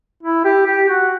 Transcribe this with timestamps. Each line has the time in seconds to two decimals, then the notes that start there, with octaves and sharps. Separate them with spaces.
0.23 E4
0.45 G4
0.66 G4
0.89 F#4